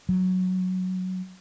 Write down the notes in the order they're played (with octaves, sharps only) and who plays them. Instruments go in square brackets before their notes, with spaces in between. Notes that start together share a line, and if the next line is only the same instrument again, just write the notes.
[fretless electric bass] F#3